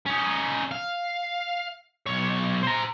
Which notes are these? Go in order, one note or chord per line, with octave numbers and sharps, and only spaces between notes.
C#4 D#4
F5
B1 C#5
C5 A#5